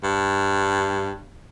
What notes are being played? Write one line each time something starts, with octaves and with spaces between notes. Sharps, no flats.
G2